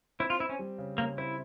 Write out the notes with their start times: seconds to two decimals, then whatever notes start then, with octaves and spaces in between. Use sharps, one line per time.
0.20 C4 E4
0.30 F4
0.39 C4 E4
0.50 C#4
0.59 G3
0.78 C#3
0.98 C#3 A#3
1.18 C4 E4